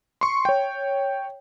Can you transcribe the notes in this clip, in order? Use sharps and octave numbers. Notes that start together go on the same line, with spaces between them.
C6 C#6
C#5 G5